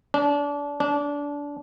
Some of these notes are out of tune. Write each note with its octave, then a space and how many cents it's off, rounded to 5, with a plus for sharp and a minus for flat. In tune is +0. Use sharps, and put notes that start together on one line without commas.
D4 -30
D4 -25